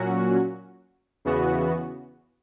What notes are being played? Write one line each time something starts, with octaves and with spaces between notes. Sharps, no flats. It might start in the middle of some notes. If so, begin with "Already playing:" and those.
Already playing: A#2 F#3 C#4 F#4
E2 C#3 E3 B3 F#4